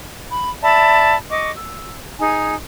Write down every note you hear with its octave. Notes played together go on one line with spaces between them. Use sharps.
B5
D5 E5 A5 B5
D#5 C#6 D6
E6
D#4 G#4 G#5